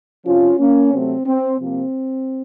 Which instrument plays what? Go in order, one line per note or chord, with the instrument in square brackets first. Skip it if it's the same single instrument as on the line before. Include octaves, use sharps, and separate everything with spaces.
[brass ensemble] F2 C3 F3 C#4 F4
A#3 C#4
C3 F#3 A3 C4
C4
C3 F3 A#3 C4